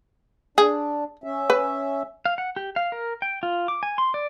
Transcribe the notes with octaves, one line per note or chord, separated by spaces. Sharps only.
D4 G#4
C#4 E5
B4
F5
F#5
G4
F5
A#4
G5
F4
D6
G#5
C6
D5